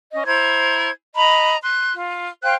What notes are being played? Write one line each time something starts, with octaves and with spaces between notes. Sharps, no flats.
C#4 D#5
E4 C5 A#5 G#6
D#5 A#5 B5
C6 F#6
F4
C5 F5 G5 F#6